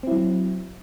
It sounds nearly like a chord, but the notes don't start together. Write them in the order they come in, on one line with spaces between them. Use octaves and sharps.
C4 E4 F#3